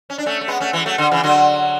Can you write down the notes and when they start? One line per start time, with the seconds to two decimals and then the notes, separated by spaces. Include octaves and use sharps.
0.10 C#4
0.18 D4
0.26 A3 C#4
0.41 A3
0.48 G#3 B3
0.60 A3 C#4
0.73 E3 G#3
0.86 F#3 A3
0.98 D3
1.11 C#3 E3
1.24 D3 F#3